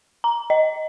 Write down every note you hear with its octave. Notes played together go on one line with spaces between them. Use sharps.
A#5
D#5